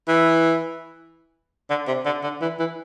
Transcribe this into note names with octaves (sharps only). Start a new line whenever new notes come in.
E3
D3
C3
D3
D3
E3
E3